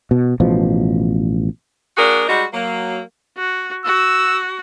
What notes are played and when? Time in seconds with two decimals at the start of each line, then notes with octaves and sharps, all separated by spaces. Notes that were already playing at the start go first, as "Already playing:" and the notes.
0.11 B2
0.40 A1 B2 F3
1.97 A#3 D4 F#4 G#4 A#4
2.28 G3 G#3 D#4 F#4
2.53 F#3 A#3
3.37 F#4
3.85 F#4 E6